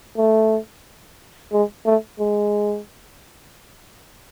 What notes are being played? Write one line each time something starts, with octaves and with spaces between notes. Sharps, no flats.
A3
G#3
A3
G#3